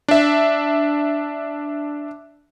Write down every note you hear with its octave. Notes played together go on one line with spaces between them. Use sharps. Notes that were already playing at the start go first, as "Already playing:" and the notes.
D4 E5